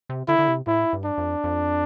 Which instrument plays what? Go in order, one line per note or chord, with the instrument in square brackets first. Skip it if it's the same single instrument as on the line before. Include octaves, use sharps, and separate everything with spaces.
[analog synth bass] C3
[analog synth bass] D3 [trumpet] E4
[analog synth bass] D3
C3
[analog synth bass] A2 [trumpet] E4
[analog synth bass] G2
[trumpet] D4
[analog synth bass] F2
F2